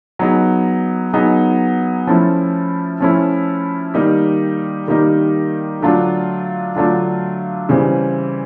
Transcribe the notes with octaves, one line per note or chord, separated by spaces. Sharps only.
F#3 B3 D#4 G#4
F#3 B3 D#4 G#4
F3 A3 C#4 E4
F3 A3 C#4 E4
D#3 G3 A#3 D#4 G4
D#3 G3 A#3 D#4 G4
D3 F#3 A3 D4 F4
D3 F#3 A3 D4 F4
C#3 E3 G3 C4